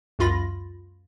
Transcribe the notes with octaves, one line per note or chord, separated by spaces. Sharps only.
C#2 F#2 F4 B5 A#6